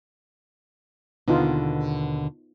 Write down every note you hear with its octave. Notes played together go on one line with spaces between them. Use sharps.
D#2 B2 D3 B3 D#4 F4